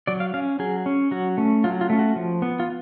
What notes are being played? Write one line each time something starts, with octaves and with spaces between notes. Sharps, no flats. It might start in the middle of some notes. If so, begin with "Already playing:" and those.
F#3 D5
F5
C#4 F5
F#3 G#4
C#4
F#3 F#4
A3 C#4
F#3 F4
F4
A3 C#4
F#4
F3
B3
F4